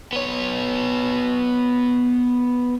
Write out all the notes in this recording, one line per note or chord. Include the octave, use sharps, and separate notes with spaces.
B3 C#5